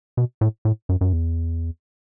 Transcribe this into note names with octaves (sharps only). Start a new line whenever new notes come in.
B2
A2
A2
F#2
F#2
E2